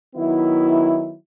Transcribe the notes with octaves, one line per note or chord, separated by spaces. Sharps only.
D#3 F#3 B3 E4